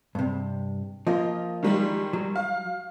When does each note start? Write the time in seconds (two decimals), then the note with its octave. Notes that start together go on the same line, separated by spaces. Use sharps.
0.15 G2 C3
1.07 F3 A#3 F4 D#5
1.63 D#3 G3 G#3
2.13 F#3
2.36 F5